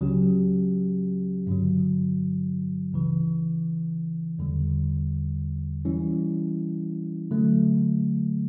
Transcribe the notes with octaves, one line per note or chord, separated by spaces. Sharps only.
C#2 C#3 F#3 C#4 G4
G2 D3 F#3
C#2 C#3 E3
E2 D3 G3
E3 G3 C#4 E4
D3 F#3 A3